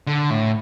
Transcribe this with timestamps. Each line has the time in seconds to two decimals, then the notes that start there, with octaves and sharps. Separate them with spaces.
0.07 D3
0.30 A2